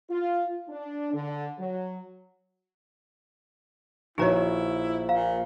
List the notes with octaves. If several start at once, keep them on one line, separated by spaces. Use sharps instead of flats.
F4
D4
D3
F#3
A#1 D#4 E4 F#4 B4 C#5 A#5
A#2 F5 A#5